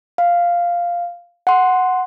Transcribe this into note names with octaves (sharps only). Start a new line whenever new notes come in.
F5
F#5 C6